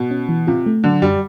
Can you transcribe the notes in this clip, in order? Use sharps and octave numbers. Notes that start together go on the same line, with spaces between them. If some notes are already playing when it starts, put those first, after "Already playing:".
Already playing: B2
C#4
E3
C3 F4
A3
D3 F#3
F#2 G3